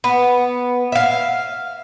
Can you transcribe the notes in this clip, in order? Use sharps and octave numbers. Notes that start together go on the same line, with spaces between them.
B3
E5 F5